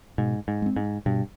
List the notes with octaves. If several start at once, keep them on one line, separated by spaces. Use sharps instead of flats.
G#2 B2
G#2
G#3 C4
G#2
G2 B2